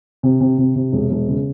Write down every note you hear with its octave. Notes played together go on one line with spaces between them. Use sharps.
C3
C3
C3
C3
E1
E1
C#3